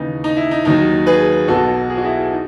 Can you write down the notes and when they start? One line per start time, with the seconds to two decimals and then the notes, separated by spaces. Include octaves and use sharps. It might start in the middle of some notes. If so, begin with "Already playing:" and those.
Already playing: D#2 C#3 E3 D#4
0.24 D#4
0.37 E4
0.51 D#4
0.65 D#2 D#3 F#3 D#4
1.06 G#4 B4
1.48 B1 B2 F#3 F#4 A4
1.90 G#4
1.98 F#4
2.04 E4 G#4
2.32 D#4